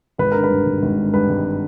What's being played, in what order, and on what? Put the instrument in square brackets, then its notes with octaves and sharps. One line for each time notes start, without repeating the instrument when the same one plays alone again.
[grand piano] G#1 B4
D3 A#4
B4
G2
G#1
G#1
D3
G2 B4
G#1